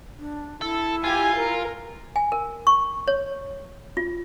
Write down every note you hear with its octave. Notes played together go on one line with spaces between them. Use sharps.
D4
E4 A4
F4 G4 G#5
A#4
G#5
A#4
C#6
C#5
F4